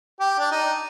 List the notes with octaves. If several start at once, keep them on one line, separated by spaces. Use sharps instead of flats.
G4
D4
D#4